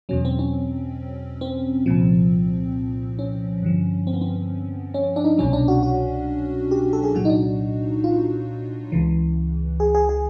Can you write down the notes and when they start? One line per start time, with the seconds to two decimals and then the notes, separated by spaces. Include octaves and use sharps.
0.09 E2 B2 F#3 C#4
0.25 C4
0.39 C#4
1.41 C4
1.86 C2 A#2 F3
3.19 C#4
3.62 G2 D3 F3
4.07 C4
4.13 B3
4.21 C4
4.94 C#4
5.16 D4
5.24 D#4
5.38 C2 B2 F#3 C#4
5.53 D4
5.68 F#4
5.83 F#4
6.71 G4
6.93 A4
7.03 G#4
7.15 C2 A#2 F#3 F#4
7.25 D#4
7.30 D4
8.04 F4
8.92 C#2 C#3 E3
9.80 G#4
9.95 G#4
10.09 G#4